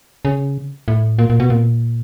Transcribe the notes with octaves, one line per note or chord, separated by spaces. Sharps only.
C#3
A2
A#2
A#2
B2
A#2